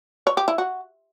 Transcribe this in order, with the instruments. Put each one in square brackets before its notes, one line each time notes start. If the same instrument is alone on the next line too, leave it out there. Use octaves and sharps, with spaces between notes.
[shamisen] C#5
G4
E4
F#4